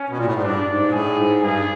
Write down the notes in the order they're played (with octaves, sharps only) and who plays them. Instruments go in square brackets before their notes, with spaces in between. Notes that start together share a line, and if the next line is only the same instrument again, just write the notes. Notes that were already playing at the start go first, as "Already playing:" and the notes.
Already playing: [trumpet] C#4
[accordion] B2
A#2
A2
G#2
[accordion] G2 [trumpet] D4
[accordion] G#2
A#2
[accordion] A2 [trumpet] G#4
[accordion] G#2
[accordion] G2 [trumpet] G#4